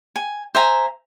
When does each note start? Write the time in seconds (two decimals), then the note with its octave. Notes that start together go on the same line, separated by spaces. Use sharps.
0.16 G#5
0.55 C5 E5 G#5 A#5